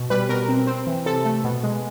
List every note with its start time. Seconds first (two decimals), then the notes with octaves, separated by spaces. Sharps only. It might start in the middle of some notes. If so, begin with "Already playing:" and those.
Already playing: B2
0.10 G3 B4
0.29 B2 A#4
0.48 C4
0.67 C4
0.87 E3
1.06 C3 A4
1.25 A3
1.44 B2
1.63 G#3